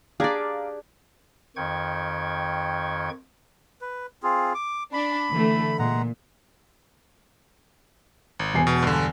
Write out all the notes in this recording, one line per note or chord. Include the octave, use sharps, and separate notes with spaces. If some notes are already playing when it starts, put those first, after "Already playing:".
D4 G4 G#4 D5 F5 A#5 D6
F2 D#3 G5 C#6 G#6
B4
C4 F4 G#4
D6
D4 B5
D3 E3 A3
A#2 G#3 F#5 A#5
G#1
E1 G#5 C7
B2
G2 D3